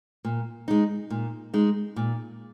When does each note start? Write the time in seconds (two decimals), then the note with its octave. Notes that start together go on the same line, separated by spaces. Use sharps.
0.25 A#2
0.68 G#3 D#4
1.10 A#2
1.54 G#3 D#4
1.96 A#2